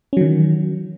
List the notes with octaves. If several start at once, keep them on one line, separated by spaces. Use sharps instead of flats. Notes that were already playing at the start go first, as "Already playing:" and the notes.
D#3 E3 F#3 C#4